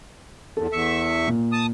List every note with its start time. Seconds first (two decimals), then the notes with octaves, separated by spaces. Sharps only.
0.57 E2 A4
0.72 E2 E5 C#6
1.28 A#2
1.52 A5 D#6